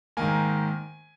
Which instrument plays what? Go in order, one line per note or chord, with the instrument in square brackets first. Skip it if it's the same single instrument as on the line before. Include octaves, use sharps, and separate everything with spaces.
[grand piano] G#2 D#3 A#3 G#5